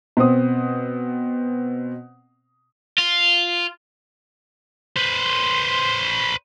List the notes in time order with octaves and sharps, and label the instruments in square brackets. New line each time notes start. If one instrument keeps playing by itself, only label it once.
[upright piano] B2 C4 C5 D#6
[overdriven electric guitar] F4
[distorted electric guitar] B4 C5